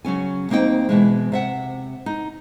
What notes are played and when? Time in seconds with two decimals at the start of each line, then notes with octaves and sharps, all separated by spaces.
0.05 C#3 F#3 C#4 G#5
0.50 D2 A#3 C4 D#4 G5
0.89 B2 E3 G#3
1.32 C3 E5 F#5
2.06 D#4